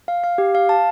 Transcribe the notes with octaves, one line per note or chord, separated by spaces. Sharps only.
F5
F5
G4
F5
A5